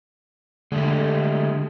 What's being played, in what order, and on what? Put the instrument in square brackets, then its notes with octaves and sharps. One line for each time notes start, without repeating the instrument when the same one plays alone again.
[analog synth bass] D3 [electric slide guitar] G#3 A3 G4